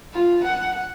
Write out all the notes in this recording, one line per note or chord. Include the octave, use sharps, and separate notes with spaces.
F4
F#5